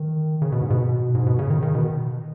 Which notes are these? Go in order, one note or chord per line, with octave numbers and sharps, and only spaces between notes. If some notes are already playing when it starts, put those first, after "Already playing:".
Already playing: D#3
C#3
B2
G#2
B2
G#2
B2
C#3
D#3
D#3
B2